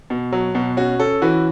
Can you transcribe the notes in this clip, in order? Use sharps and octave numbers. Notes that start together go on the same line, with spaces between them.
B2
F#3
B2
C#4 F#4
C#4 A4
E3 F#4 B4